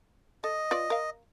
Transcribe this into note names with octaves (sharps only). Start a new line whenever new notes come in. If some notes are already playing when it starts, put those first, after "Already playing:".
A4 D#5
F4 B4 D5
A#4 F5